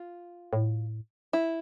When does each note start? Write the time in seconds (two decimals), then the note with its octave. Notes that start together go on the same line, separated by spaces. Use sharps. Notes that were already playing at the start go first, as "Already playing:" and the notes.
Already playing: F4
0.53 A2
1.33 E4